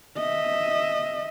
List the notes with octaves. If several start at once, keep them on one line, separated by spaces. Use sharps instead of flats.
D#5 E5